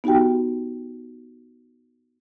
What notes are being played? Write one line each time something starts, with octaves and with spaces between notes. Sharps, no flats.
B3 D#4 F#4 G4 G5